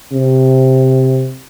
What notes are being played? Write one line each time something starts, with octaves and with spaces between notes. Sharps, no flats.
C3